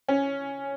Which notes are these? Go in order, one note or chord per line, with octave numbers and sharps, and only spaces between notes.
C#4